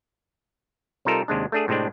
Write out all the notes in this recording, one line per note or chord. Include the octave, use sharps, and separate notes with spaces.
C3 G3 D#4 F4 A4 A#4
D#2 C3 G#3 D4
A3 D4 G#4
A2 C3 G#3 C4 D4